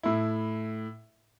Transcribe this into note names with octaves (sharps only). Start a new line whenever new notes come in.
A2 E4